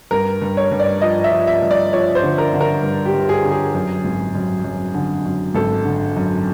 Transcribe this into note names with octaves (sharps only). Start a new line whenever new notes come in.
G2 A#4
G2
C#5
G2
D5
F3 D#5
E5
F3
E5
G2
D5
F3 C#5
C5
D3
A#4
D3
A#4
G2
G4
G2
G#4
D3
G#4
F#2
G#1
F#2
F#2
D3
F#2
G#1 A4
D3
F#2